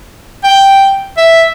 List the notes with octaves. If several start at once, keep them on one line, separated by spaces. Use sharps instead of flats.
G5
E5